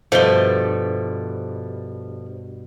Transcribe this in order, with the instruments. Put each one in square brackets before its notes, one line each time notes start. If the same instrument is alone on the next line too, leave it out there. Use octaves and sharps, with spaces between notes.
[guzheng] G2 B2 [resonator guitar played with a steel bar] F3 A3 [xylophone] C5 G7